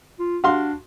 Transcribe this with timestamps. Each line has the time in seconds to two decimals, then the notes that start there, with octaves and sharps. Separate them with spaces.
0.19 F4
0.44 D4 F#4 F5 C6